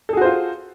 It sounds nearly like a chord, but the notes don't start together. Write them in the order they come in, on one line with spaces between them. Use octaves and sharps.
A4 G#4 F#4 C5 F4